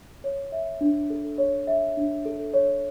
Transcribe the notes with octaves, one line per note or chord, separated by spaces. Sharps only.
C#5
E5
D4
A4
C#5
E5
D4
A4
C#5